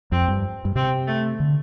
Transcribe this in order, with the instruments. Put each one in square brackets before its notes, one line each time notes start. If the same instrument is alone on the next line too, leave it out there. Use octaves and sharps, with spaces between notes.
[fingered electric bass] F2 [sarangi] C4
[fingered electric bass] G2
G2
[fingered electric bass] C3 [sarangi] C4
[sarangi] A3
[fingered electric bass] D3